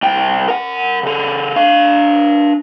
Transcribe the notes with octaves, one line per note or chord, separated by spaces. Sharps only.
C2 G5
A#4 F#5
C#3 A4
D4 F5